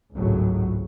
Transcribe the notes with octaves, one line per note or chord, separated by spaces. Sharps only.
G#1 C#2 A2 F#3